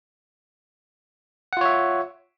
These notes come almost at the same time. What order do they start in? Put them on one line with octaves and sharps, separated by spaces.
F#5 F4 C#5 E5